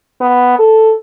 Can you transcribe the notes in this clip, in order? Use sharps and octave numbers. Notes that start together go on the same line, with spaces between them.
B3
A4